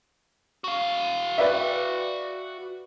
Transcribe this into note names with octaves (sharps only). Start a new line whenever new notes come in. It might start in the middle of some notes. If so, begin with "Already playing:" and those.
F#4 F5
B4 D5 E5